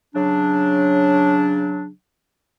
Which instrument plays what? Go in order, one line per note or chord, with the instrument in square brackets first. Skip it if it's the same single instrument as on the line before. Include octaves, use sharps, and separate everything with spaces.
[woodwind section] C#3 F#3 D4